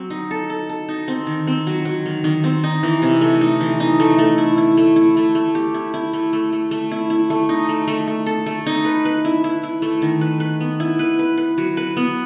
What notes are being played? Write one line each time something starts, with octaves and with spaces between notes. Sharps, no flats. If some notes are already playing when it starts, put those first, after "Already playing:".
Already playing: F#3 C4
D#4
A4
A4
A4
D#4
C4
D#3
C4
F#3
F#3
D#3
D#3
C4
D#4
E3
C3
A3
D#4
E3
D#4
A3
A3
E4
E4
A3
E4
A3
A3
G4
E4
E4
A3
A3
A3
A3
E4
E4
A3
D#4
A3
A3
A3
A4
A3
D#4
B4
B4
E4
E4
E4
A3
D#3
B4
B4
B3
E4
B4
B4
B4
F#3
B4
B3